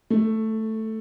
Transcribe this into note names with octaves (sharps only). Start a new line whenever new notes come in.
A3